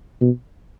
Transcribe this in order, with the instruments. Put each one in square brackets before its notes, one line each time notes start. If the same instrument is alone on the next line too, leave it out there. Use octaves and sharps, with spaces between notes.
[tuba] B2